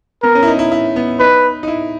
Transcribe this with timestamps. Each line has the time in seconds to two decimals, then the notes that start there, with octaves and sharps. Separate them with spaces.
0.22 B3 A#4
0.35 C#4
0.43 E4
0.47 D#4
0.59 E4
0.72 E4
0.96 B3
1.20 D#4 B4
1.63 D#4
1.68 E4